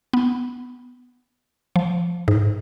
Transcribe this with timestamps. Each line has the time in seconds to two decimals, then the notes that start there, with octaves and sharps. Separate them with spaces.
0.13 B3
1.76 F3
2.28 G#2